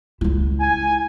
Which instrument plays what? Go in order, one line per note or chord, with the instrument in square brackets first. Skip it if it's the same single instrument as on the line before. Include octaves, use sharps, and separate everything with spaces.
[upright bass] C#2 E4
[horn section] G#5